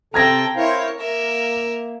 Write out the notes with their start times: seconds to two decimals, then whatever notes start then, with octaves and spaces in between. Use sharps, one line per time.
0.14 C3 C4 A4 G5 A#5 G#6 A#6
0.56 E4 A#4 C5 C#5 F5
0.99 A#3 A#4 E5